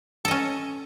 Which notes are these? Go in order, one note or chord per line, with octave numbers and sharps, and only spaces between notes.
C#4 A4 D#5